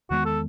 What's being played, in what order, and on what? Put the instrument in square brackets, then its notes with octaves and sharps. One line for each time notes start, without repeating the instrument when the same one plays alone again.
[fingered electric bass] E2 D#3 G#3 B3 [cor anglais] F#4
[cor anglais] A4